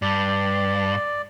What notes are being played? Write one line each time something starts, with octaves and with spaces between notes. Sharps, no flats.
G2 D5